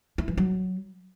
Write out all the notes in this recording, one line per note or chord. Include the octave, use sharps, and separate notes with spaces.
E4
E3
F#3